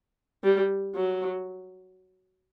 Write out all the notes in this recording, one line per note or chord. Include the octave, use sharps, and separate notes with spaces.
G3
F#3